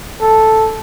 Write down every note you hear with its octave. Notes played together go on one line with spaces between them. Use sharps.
A4